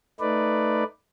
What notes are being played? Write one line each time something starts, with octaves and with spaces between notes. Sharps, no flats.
A3 D#4 B4 D5